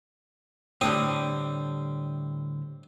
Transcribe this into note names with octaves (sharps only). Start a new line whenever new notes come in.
A2 D3 G3 C4 G5 D#6